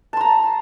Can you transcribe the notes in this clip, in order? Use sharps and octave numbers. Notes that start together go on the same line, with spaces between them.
A5 A#5 C6